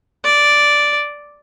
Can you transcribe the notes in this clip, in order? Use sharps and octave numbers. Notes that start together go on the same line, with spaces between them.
D5